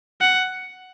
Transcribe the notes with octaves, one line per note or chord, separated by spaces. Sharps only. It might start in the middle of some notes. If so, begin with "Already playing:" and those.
F#5